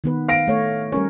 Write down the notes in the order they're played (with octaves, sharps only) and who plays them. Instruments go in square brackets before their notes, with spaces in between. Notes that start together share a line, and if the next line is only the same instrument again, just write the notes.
[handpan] D#3 B3 B4
[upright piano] F5 A#6 D7
[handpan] A3 C#5
[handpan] G3 A#4 C#5 [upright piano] C#4